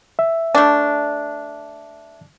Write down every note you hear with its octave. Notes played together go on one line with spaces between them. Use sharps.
E5
A3 D4